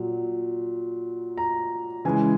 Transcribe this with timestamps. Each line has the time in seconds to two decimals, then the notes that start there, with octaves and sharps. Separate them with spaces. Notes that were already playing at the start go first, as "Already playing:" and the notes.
Already playing: A#2 F#3
1.38 A#5
2.05 C#3 E3 G#3 G#5